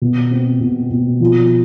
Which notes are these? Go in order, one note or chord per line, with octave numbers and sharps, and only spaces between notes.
B2
C4
B2
B2
F3